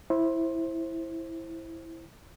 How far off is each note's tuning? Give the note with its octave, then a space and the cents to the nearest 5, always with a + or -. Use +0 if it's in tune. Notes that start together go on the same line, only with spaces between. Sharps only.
E4 +0 C5 +20